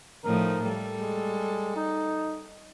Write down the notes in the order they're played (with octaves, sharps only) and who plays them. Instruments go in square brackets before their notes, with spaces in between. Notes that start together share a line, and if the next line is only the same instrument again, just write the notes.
[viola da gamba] A2 F3 D#4 [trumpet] A#4
[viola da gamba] G3 A4
[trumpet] G#3
D#4